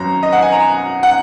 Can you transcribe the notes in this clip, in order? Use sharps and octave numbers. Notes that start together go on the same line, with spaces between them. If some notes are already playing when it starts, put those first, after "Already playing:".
Already playing: G#1 F#2 F#3 C#4 A#5
D#5
F#5
G#5
A#5
F#5